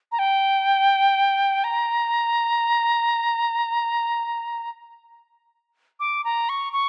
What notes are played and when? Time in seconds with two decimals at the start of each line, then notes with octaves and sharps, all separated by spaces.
0.12 A#5
0.19 G5
1.64 A#5
6.00 D6
6.24 A#5
6.49 C#6
6.73 C#6